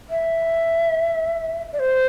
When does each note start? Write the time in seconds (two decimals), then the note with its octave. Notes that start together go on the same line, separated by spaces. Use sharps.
0.10 E5
1.73 D5
1.79 C5